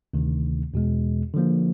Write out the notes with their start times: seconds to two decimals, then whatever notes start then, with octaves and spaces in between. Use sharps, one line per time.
0.14 D2 C3 D#3
0.74 E2 B2 G#3
1.34 D3 F3 A#3